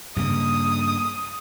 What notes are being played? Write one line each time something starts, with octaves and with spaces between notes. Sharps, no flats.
G2 C#3 A#3 D#6